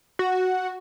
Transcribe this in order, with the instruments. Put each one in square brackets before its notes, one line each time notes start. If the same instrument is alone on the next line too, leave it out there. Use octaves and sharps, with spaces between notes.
[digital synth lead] F#4